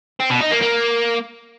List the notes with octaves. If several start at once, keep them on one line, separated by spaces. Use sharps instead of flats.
C4
B2
D#4
A#3
A#3